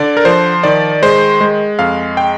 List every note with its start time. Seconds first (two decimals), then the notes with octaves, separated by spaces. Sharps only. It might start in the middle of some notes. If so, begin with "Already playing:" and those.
Already playing: D3 D5
0.17 A#4
0.25 F3 C5
0.63 D#3 D5
1.02 G#3 C5
1.41 G#3
1.79 F2 F5
2.17 G5